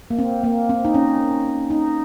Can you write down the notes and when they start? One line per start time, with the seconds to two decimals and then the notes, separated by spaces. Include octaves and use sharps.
0.10 A#3
0.19 C4
0.44 A#3
0.70 C4
0.85 D#4
0.95 C#4
1.71 D#4